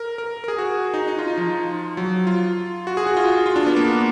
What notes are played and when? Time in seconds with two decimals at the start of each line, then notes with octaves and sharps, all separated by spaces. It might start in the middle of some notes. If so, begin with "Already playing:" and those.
Already playing: A#4
0.18 A#4
0.44 A#4
0.48 G#4
0.58 F#4
0.94 D#4
1.08 D#4
1.18 F4
1.28 D#4
1.37 F3
1.97 F#3
2.27 F4
2.87 F#4
2.97 G#4
3.07 F#4
3.17 F4
3.46 F4
3.56 D4
3.67 B3
3.76 A#3